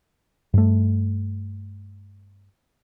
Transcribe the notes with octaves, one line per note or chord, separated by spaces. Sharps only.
G2 A3